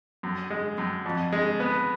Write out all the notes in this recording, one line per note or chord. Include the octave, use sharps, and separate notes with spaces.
F#2
G#3
F#2
F2
G#3
B3